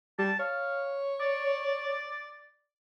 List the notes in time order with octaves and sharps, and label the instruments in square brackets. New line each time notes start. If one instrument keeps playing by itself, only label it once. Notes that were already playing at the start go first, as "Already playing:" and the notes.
[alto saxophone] G3 [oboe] A5
[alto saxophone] C#5 [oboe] F5
[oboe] D5